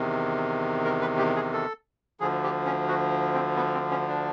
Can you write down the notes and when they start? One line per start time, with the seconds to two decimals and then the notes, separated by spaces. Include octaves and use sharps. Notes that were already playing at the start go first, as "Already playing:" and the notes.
Already playing: E2 C3 D#3
0.85 A#4
1.01 B4
1.18 G4
1.36 G#4
1.53 A4
2.20 D2 D3 F3 G#4
2.43 G4
2.66 C#4
2.88 F#4
3.34 C4
3.56 B3
3.74 C4
3.91 C#4
4.08 D4